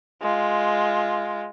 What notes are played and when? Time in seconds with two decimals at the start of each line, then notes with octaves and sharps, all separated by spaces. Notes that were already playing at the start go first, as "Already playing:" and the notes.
0.22 G#3 F4